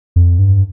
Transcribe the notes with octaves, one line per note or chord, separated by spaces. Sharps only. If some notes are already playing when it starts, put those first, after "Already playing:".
F2
G2